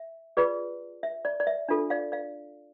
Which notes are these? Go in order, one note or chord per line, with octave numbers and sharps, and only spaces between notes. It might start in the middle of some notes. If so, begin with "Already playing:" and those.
Already playing: E5
F4 G#4 B4 D5
E5
D5
D5
E5
D4 F4 A4
D5 F5
D5 F5